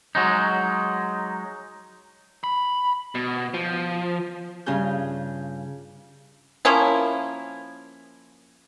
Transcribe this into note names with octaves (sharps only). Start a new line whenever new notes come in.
F#3 G#3 D#4
B5
B2
F3
G2 C#3 C#4 F4 G#4 G6
F3 A#3 C#4 E4